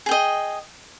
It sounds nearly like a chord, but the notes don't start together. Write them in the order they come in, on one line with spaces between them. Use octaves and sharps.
G#4 G5 D#5